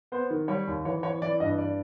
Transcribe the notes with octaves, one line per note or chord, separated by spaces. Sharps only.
B3 C5
D#3
G3 C#5
D#2
E3 C#5
E3 C#5
E3 D5
G2 D#5
D5